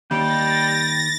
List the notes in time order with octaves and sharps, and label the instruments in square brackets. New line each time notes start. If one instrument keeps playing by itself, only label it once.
[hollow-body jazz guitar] D#2 [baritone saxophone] G3 [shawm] G5 [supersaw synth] A6 A#6